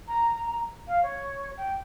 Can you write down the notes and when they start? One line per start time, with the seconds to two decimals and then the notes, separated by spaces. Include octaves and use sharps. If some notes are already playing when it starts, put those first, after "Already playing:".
0.08 A#5
0.88 F5
1.03 C#5
1.57 G5